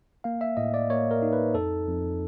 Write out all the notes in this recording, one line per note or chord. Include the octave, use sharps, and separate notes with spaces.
A#3 F5
E5
A2 D#5
D5
A#3 C#5
A#4
D#4
B4
F2 A4
F2